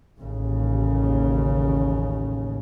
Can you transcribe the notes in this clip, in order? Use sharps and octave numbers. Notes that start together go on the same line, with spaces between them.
A1 D#2 C#3